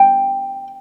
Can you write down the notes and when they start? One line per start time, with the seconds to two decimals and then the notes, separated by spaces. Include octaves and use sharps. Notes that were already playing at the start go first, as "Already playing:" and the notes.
Already playing: G5